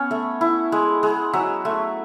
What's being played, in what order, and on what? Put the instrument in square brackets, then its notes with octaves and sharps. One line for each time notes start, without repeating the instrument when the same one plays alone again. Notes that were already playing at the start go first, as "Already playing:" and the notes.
Already playing: [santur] B3 C#4 F#5
A3
E4
G#3
G#3
F#3 E5
A3